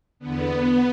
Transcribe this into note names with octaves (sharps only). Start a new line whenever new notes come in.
E2 D3 B3